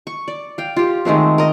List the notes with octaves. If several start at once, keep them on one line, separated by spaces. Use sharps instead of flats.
C#6
D5
F5 G5
F4 G4
D#3 G#3 A3 C4
A#4 D#5